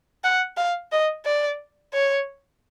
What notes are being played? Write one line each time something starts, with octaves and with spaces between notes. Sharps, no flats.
F#5
F5
D#5
D5
C#5